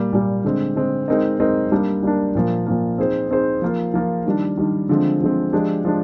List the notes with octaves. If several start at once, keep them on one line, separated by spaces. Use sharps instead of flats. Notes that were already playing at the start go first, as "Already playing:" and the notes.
Already playing: A#2 G3 A#3
A#2 G3 A#3
D3 G#3 C4
D3 G#3 C4
G#3 C4 D#4 A#4 D#5
G#3 C4 D#4 A#4 D#5
G3 A#3 D4
G3 A#3 D4
A#2 F3 A#3
A#2 F3 A#3
C4 D#4 G#4 C5
C4 D#4 G#4 C5
F3 A#3 F4
F3 A#3 F4
D#3 G3 D4
D#3 G3 D4
D3 F3 G#3 C4
D3 F3 G#3 C4
F3 G#3 D4 G4
F3 G#3 D4